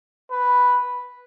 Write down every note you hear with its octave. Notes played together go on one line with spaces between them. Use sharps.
B4